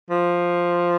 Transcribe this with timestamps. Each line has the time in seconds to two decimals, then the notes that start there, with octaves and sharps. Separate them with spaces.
0.10 F3